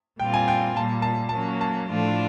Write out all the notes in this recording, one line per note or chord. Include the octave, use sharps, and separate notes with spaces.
A#2 G3 C4 F4 G5
G#5
G5
A#2 G3 A#3 A5
A5
F#3 A#3 C#4 A5
A5
A2 F3 A3 D4 F4